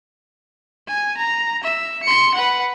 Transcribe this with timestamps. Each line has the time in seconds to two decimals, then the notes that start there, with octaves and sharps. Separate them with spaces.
0.87 G#5
1.17 A#5
1.63 E5
2.03 C6 C#7
2.34 B4 F#5